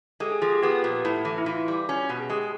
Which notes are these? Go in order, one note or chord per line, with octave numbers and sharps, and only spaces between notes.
G#3 G4 A4
G#4
F3 G#4
G4
B3 G4
A#2
A2
E3
E4
E3 F4
G3
C#4 F#4
B2
G#4
G#3 G4